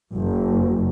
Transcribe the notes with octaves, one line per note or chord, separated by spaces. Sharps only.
F#1